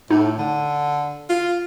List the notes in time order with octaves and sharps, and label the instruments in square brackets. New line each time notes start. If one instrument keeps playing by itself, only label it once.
[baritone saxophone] A2 [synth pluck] D#4
[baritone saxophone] D3
F4